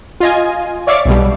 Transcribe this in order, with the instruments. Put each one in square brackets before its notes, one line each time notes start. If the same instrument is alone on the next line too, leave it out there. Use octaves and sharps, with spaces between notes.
[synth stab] F4 D#5 G#5
C#5 D5 E5 F5 C#6 D6
B1 B2 G3